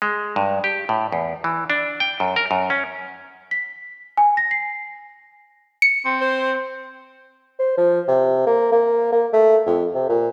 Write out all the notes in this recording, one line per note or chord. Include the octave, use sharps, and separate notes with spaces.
G#3
G2
G4
A2
E2
E3
D4
G5
F#2
A#4
F#2
C#4
B6
G#5
A#6
C7
C#7
C4
C5
C5
F3
C3
A#3
A#3
A#3
A3
F2
C3
A#2